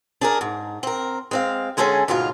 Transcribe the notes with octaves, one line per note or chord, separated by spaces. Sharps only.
D4 G#4 A#4
G#2
C4 A#4
G#3 C4 F5
D3 G#3 B3 C#4 G#4 A4
D2 G#2 B2 F4 F5